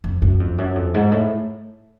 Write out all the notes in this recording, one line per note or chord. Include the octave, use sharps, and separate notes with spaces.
F2
F#2
F2
F#2
F2
G#2
A2